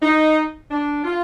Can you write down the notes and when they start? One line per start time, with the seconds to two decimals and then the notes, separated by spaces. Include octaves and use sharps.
0.02 D#4
0.71 D4
1.04 F4